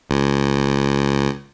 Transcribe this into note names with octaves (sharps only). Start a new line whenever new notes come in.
C#2